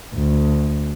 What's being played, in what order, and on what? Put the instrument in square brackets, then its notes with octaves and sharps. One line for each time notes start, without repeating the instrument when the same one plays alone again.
[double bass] D2